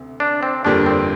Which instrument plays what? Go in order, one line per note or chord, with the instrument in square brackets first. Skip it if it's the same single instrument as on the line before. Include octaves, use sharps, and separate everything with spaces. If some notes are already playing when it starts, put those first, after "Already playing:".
Already playing: [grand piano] D2 C3
[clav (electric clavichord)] D4
C4
[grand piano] G1 F2 D3 G3 A#3 [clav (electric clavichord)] D4
[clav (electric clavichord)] C4